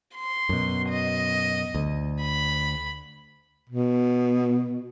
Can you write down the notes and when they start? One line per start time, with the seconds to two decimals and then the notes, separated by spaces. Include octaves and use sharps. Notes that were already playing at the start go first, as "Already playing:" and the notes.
0.16 C6
0.49 F#2 B2
0.89 D#5
1.75 D2
2.22 B5
3.69 B2